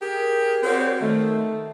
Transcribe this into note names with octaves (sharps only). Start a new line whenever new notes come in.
G4 G#4 A#4
C4 F#4 A#4 C#5 D5
D#3 A3